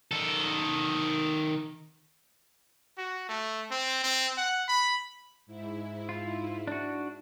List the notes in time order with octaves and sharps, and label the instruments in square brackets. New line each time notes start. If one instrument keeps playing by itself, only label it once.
[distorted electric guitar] D#3 A4
[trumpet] F#4
A3
C4
C4
F#5
B5
[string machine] G#2 E4
[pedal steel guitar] F4
D4 F#4